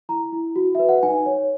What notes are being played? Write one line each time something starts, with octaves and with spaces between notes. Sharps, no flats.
E4 A#5
E4
F#4
B4 E5
F#5
D#4 G#5
C#5